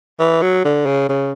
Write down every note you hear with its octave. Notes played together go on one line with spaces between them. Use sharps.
E3
F#3
D3
C#3
C#3